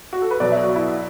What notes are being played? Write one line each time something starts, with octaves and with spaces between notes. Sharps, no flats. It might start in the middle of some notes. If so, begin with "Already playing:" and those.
F#4
A4
B4
B2 F#3 D5
E5
F#4
E4